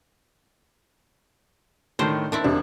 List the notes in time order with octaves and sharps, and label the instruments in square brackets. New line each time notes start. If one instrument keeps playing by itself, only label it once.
[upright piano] A2 D#3 [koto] D4 C5
[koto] D#3 C4 E4 [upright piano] D4
[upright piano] E1 C3 [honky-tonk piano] D4